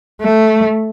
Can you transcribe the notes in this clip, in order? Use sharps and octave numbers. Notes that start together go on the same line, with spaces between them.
A3